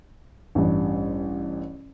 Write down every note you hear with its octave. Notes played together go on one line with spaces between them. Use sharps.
A1 G2